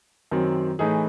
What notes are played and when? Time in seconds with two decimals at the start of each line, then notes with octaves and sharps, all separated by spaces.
0.31 F#2 D#3 F#3 C4
0.79 A2 E3 A3 D#4 G#4